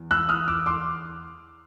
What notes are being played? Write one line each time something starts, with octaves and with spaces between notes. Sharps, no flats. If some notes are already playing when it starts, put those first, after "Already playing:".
Already playing: E2
E6 F#6
D#6 F6
D6 E6
C6 D6